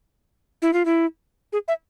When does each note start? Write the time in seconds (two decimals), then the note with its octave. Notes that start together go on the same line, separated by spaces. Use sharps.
0.62 E4
0.73 F4
0.85 E4
1.53 G#4
1.68 E5